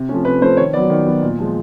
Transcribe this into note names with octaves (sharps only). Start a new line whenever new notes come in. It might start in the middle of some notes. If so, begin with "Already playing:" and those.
Already playing: C3
F3 A3 C#4
C3 B4
F3 A3 C#4 C5
D#3 C#5
F#3 B3 D5
D#3
F#3 B3
A#2
F3 G#3